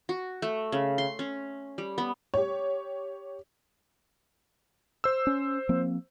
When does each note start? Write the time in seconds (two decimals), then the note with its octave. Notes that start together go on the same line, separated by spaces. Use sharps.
0.09 F#4
0.42 A3
0.72 C#3
0.98 C6
1.19 C#4
1.78 G3
1.98 B3
2.34 G4 C#5
5.04 C5 E6
5.27 C#4
5.69 F3 A#3 C4